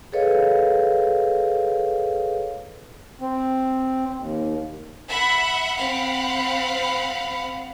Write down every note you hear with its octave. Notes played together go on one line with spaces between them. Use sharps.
G#4 A4 B4 C#5 D#5 F5
C4
D#2
E5 F#5 B5
C4 F5 F#5 B5